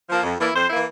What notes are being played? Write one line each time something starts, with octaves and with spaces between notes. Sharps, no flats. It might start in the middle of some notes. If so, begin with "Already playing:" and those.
F3 A#3
F2
E3 A#3 E4 D5
F2 C5
E3 A#3 E4